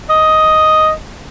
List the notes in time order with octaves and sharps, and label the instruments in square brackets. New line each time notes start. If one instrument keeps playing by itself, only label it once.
[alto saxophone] D#5